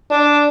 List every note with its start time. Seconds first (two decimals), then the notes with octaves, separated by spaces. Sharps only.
0.11 D4